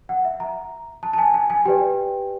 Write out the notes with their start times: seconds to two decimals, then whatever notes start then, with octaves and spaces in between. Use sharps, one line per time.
0.09 F#5
0.25 E5
0.40 A#5
1.03 A5
1.13 A5
1.18 G#5
1.34 G#5
1.50 G#5
1.65 G4 B4 D5 G5